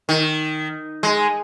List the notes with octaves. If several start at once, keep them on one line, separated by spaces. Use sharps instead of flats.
D#3
G#3